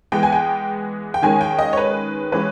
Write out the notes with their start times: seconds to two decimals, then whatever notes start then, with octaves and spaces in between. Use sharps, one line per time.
0.12 E3 G#3 B3 G5
0.23 G#5
0.32 G5
1.14 G5
1.22 D#3 G#3 C#4 G#5
1.41 G5
1.59 D#5
1.73 C#5
1.77 B4
2.32 E3 G#3 C#4 B4